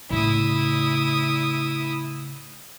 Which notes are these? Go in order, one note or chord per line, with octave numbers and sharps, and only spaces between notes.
A2 C#3 E4 D#6